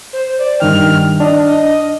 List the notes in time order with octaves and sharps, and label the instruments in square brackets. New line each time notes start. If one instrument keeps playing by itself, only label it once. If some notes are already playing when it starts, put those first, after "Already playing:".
[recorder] C5
D5
[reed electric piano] G2 D#3 G5 [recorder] F6
[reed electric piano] D4 [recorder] D#5
[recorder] D#5